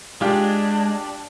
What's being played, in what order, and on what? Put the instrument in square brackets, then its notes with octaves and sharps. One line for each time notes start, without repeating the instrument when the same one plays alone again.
[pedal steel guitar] G#3 [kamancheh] D4 [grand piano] F4 G4 [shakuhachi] A5